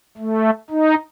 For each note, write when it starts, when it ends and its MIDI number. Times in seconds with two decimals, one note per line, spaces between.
0.17 0.50 57
0.70 0.95 63